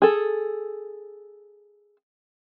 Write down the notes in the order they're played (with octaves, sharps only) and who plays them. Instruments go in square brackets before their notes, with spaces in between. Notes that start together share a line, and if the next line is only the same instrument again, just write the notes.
[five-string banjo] G#4 A4